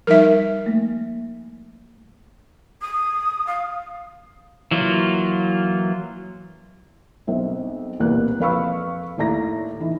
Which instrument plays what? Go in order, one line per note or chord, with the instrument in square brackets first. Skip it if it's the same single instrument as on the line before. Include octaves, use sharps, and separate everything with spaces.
[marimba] F3 G3 D#4 [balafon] A#4 E5
[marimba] A3 A#3
[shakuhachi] D#6
F5
[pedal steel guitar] E3 F#3 A#3 F4
[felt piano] B1 C4 E5
E1 C2 A#2 A#3 B4 F#6
F2 B4 F5 B5 C#6 E6
D#2 A2 D5 A#5 A#6
E3 D#4